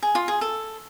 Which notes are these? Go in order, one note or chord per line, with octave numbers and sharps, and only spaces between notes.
G#4
F4
G#4
A4